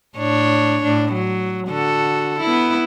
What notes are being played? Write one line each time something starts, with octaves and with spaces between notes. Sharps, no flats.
A2 D4 C#5
A2 D4
F#3
D3 F#4 A4
B3 E4